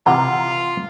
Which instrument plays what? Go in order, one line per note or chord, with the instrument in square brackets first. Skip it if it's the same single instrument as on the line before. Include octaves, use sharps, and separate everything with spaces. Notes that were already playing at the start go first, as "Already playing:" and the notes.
[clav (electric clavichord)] C3 E3 [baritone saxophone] F4 [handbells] F#5 A#5